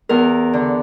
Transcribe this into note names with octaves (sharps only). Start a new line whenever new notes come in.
E2 A#4
D3